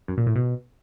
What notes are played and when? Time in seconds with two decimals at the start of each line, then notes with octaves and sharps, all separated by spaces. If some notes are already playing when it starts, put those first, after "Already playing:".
0.08 F#2
0.17 A#2
0.27 A2
0.36 B2